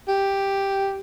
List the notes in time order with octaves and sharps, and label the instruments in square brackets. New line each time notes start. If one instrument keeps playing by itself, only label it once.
[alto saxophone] G4